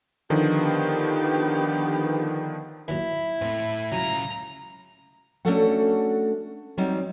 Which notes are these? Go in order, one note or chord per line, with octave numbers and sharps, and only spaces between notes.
D3 D#3 F3 B3 G4
D#2 F#3 E4
A2 C4
C#3 F#3 F4 G#5 A#5
A3 C#4 D4 F#4 A4 F#5
F#3 G3 C4 D#4